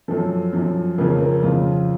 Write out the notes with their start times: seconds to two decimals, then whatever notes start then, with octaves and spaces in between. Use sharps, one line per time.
0.08 F#2 F3 A4
0.53 F#2 F3
0.98 F2 C#3 F3 A#4
1.20 A#4
1.43 F2 C#3 F3 F4